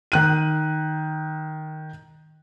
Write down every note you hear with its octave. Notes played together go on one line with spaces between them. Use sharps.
D#3 F#6 D#7